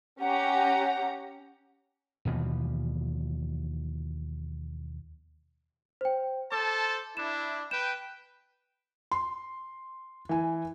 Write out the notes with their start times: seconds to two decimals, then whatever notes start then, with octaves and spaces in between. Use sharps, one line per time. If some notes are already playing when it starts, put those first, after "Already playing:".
0.20 C#4 G4 F#5 A#5
2.25 D#2 B2 E3 F3
6.01 C5 G5
6.52 A4 C5 A5 D6
7.17 D4 E4 E7
7.71 B4 G5 E7
9.12 C6
10.29 E3 G#5